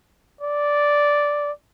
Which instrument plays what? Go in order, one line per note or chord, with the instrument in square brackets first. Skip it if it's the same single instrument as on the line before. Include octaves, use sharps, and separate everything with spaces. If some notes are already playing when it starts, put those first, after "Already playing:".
[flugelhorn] D5